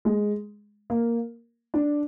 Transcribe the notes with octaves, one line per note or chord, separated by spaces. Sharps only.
G#3
A#3
D4